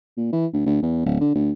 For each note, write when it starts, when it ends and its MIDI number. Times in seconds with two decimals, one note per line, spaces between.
0.17 0.31 46
0.33 0.47 52
0.53 0.62 38
0.66 0.80 38
0.82 1.01 40
1.05 1.19 26
1.21 1.31 50
1.36 1.52 38